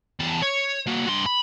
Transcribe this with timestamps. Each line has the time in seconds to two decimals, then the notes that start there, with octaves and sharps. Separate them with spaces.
0.20 E2 A5
0.42 C#5
0.87 A#3 F#4
1.08 G2 C6
1.26 B5